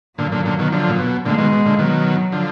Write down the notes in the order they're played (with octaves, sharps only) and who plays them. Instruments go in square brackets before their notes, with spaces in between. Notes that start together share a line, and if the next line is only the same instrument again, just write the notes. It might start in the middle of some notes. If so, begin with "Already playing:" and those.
[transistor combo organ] A#2 D3 [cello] F#3
[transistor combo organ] A#2 D3
A#2 D3
B2 D#3
D3 F3
A#2
B2
[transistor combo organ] A#2 D3 [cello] G#3
[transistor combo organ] B2 D#3
B2
A#2 D3
[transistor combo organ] B2 D#3 [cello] F#3
[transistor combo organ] D3 F3